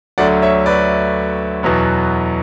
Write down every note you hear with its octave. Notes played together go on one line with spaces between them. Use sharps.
D2 D3 F#3 A3 D5 F#5
C#5 E5
B4 D5
E2 B2 F#3 B3